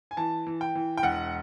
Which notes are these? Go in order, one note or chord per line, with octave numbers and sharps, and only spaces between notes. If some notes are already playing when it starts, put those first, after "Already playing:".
G#5
E3 A5
E3
G5
E3
G5
E1 F#5